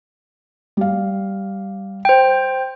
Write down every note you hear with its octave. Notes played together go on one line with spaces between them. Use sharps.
G3 F5
C5 G5